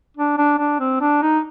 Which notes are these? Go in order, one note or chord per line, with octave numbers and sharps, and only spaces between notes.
D4
D4
D4
C4
D4
D#4